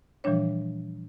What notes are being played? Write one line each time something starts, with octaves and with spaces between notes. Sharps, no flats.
A#2 E3 F3 G3 D4 C#5